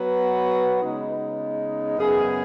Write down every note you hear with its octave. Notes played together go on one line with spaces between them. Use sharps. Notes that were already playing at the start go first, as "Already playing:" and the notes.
Already playing: F#3 B3 F#4 B4
C#3 G#3 B3 D#4
F#2 C#3 B3 G#4